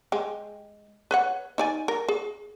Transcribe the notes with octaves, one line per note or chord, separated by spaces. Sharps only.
G#3 G4
B4 C#5 F#5
D#4 D5 G#5
A#4
G#4